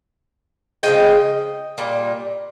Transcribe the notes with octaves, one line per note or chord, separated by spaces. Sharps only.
C#3 F3 G#3 D#5 G5
A#2 G3